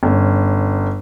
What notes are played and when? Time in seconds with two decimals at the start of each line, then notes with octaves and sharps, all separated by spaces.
0.03 G1 C#4